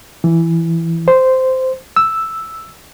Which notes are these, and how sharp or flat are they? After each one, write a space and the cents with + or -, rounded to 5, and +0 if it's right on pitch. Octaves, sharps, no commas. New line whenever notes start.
E3 +10
C5 -10
E6 +0